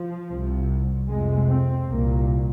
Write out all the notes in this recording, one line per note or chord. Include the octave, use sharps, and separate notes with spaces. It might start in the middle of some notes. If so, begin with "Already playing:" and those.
Already playing: F3
C2 C3
F2 C3 G#3
C4
C2 A#2 A#3